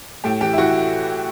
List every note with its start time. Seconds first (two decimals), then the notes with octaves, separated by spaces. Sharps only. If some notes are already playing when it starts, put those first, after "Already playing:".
0.24 A2 G4
0.41 E3 G4
0.53 E4
0.58 E3 F#4